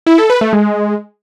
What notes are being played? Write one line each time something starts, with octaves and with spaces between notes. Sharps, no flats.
E4
A4
B4
A3
G#3